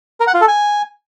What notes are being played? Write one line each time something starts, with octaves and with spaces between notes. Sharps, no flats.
A#4
F#5
F4
A4
G#5